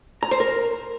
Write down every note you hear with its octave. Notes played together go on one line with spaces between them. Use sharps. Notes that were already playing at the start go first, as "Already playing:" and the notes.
A#5
C5
A#4